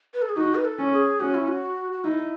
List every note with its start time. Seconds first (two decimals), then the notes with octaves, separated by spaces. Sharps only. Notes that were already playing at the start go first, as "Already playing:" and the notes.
0.14 B4
0.22 A4
0.29 G#4
0.37 D#4 F#4
0.55 B4
0.65 A4
0.79 C#4
0.93 G#4
1.20 C#4 F#4
1.35 E4
1.48 F#4
1.92 F#4
2.04 D#4 E4